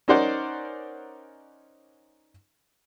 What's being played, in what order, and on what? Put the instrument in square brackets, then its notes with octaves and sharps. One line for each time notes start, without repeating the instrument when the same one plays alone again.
[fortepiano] C#4 D#4 A#4 C5 D5 F#5